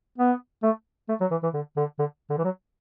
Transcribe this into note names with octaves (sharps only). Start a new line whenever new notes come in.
B3
A3
A3
F#3
E3
E3
D3
D3
D3
D3
E3
F#3